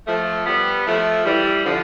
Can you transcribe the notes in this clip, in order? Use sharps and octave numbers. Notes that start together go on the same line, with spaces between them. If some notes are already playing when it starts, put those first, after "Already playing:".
F3 A3
G3 B3
F3 A3
E3 G3
D3 F3